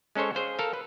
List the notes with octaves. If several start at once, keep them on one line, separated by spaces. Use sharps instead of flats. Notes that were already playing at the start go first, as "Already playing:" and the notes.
G#3 C#4 A4 C5 C#5
G#4 C5 F5
A4 A#4 F5
B4